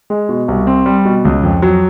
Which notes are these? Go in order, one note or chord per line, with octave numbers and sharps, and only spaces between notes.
G#3
B2
C2
C4
G3
B2
C#2
F2
F#3